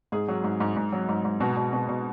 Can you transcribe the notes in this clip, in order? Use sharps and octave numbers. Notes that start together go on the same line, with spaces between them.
G#2 G#4
F#3
G#2
G#2
G#2
F#3
G#2
G#2
B2 F#4
B2
B2
B2